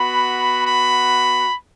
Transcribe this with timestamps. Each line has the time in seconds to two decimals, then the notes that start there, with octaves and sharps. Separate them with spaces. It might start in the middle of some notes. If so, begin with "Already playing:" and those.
Already playing: B3 F#4 B5
0.65 B5